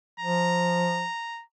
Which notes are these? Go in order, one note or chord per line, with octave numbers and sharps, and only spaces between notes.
F3 A#5